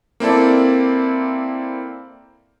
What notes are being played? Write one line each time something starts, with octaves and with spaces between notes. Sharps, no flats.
A#3 C4 E4 A4 D5